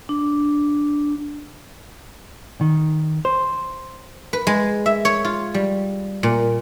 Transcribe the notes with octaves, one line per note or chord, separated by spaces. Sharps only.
D4
D#3
C5
B4
G#3
E5
C#5
F4
G3
A#2